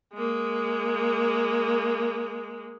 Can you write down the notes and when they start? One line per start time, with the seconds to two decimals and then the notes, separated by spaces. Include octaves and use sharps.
0.14 G#3 A#3